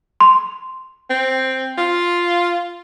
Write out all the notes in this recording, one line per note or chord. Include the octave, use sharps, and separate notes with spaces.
C6
C4
F4